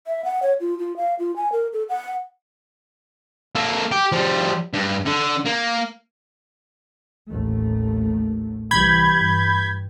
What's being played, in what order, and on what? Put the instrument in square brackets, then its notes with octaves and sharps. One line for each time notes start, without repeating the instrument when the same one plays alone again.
[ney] E5
F#5
C#5
F4
F4
F5
F4
G#5
A#4
A4
F#5
[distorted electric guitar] A#3 A4
G4
F3 G3
G2
D3
A#3
[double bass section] A1 D#2 A3
[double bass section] C2 E3 G3 [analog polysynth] B5 G6 G#6
[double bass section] G2